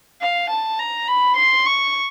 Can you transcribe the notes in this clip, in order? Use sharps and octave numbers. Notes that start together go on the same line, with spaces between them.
F5
A5
A#5
B5
C6
C#6